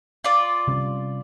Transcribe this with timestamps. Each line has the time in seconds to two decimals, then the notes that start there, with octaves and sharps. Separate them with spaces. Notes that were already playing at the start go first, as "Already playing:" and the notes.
0.24 F4 D5
0.68 C3 G3 C#4